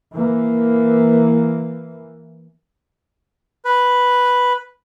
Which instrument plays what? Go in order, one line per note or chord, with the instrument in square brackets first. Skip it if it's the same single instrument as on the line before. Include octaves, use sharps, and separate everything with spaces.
[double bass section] E3 A#3
[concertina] B4